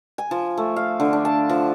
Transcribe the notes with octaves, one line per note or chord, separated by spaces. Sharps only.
G#5
F3
A3
F5
D3
D4
A5
F3